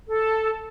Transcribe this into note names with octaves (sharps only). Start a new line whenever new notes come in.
A4